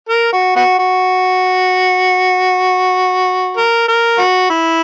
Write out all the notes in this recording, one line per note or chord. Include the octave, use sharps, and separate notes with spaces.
A#4
F#4
B3 F#4
F#4
A#4
A#4
F#4
E4